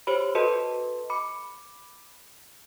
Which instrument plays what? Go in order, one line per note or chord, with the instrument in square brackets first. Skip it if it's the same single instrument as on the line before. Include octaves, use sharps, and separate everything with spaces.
[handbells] G4 C5 C#5 B5
F#4 A4 B4 D#5 A5 C6
B5 D6 C#7